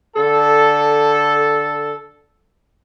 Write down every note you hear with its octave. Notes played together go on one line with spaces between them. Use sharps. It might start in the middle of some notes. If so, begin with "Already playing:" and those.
D3 A4